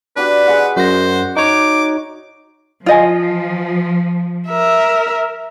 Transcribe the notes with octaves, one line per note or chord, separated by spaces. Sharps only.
D4 F#4 G4 B4
G#3 D#5 F#5
F#2 F#4 C5 A#6
D#4 C#5 D6
F3 F4 D#5 G#5
A#4 E5